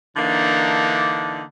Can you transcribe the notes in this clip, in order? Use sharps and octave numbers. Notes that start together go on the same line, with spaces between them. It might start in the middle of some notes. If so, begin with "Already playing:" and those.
D3 E3 A#3 D4 D#4